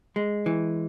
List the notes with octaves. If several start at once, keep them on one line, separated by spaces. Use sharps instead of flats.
G#3
E3